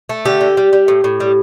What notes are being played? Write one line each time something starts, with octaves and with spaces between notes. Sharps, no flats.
A3
D3 G4
D3
G3
G3
A2
A2
G3